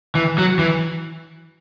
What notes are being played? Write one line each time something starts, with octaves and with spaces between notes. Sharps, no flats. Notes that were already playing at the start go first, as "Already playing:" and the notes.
E3
F#3
E3